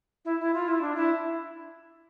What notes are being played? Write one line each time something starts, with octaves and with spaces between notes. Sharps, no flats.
E4
E4
F4
E4
D4
E4